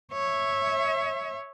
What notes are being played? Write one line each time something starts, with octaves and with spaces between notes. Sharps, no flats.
C#5 E5